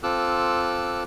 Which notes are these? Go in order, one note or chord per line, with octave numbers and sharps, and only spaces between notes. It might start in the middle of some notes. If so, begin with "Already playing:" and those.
C4 F4 A4 D6 E6 F#6